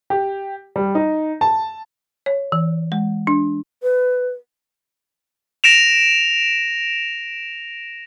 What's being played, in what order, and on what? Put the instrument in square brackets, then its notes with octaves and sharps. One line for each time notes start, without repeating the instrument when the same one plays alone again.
[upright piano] G4
G3
D#4
A5
[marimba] C#5
E3
G#3
D4
[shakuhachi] B4
[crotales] A#6 D7 E7 F7